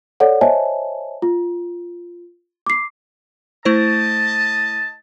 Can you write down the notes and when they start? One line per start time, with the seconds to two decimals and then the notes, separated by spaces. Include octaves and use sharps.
0.20 A4 C#5 D5 F#5
0.41 C5 C#5 D#5 E5 G#5 A5
1.22 F4
2.66 D6 C7
3.65 A3 E4 C5 D#5 A5